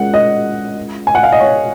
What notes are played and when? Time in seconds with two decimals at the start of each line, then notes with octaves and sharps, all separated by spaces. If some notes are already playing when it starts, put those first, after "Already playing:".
Already playing: G#3 C#4 F4 A#4 F#5
0.14 D#5
1.07 G#5
1.15 F#5
1.23 F5
1.32 D#5
1.40 C#5